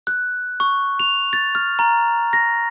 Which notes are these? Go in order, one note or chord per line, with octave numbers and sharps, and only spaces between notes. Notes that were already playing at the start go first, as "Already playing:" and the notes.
F#6
C#6
F7
A6
F6
A#5
A#6